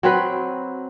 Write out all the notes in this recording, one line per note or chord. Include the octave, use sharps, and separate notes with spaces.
F#3 C4 B4